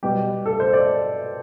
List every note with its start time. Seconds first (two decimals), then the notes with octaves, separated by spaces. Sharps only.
0.03 B2 G3 B3 G4
0.46 A4
0.60 C5
0.73 D5